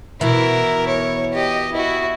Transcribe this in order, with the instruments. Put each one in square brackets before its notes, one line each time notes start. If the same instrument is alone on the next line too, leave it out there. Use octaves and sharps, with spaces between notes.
[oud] B2 E3 [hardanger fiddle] E4 A#4
[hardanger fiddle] C#5
G4 D#5
E4 F#4